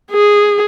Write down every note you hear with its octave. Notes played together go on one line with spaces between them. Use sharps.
G#4